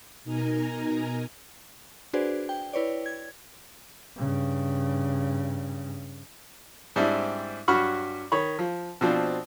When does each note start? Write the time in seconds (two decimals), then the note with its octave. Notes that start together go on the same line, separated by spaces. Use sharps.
0.24 B2 D#4 A#4 G#5 A#5
2.13 D4 F#4 G#4 B4 C5 D5
2.49 G5
2.73 E4 B4 C#5 D5
3.06 G#6
4.17 G2 C#3
6.96 G#2 G3 C4 D4 E4
7.68 G2 F#3 F#4 B5 C#6 F6
8.32 D#3 C#5 B5
8.59 F3
9.01 B2 F3 C4 D4